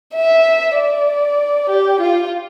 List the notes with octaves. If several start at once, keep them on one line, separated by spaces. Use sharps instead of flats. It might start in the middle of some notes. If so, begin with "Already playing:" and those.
E5
D5
G4
F4